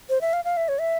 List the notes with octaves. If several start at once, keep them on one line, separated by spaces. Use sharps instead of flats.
C5
E5
F5
F5
E5
C#5
E5